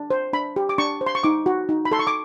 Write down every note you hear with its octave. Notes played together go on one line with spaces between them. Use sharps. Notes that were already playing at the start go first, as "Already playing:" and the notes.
Already playing: D4
C5
D4 B5
G4
D6
D4 C#6
C5
C6
C#6
D#4 D6
F#4
D#4
B5
A4 C6
C#6
D6